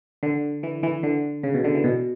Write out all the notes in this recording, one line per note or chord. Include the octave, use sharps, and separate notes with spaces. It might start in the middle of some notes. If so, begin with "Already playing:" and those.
D3
E3
E3
D3
C#3
B2
D3
E3
B2